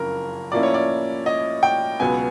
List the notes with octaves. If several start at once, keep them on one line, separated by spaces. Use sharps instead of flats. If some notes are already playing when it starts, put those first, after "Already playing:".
Already playing: F#1 F2 C#3 A#4
A2 F3 A#3 C#4 E4 D5
C#5
D5
D#5
G5
C#2 B2 F#3 B3 G#5